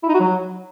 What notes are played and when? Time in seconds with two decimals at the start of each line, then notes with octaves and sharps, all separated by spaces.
0.03 E4
0.08 D#4
0.14 F#4
0.20 F#3